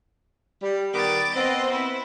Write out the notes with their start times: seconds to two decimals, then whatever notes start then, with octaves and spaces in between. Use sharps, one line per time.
0.63 G3
0.93 D#3 G3 B3 D6 A6
1.35 B3 C4 D#5
1.71 E4